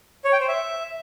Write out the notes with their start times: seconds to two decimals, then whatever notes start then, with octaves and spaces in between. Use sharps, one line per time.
0.25 C#5
0.32 G5
0.40 C5
0.48 E5